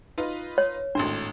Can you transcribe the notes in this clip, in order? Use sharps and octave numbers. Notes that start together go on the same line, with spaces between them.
D#4 F4 B4
C#5
G#1 A2 D4 C6